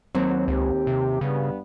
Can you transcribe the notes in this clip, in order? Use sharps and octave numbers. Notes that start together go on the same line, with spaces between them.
D#2 F#3 C4
C#2 G4
C3
G2 C#3 B3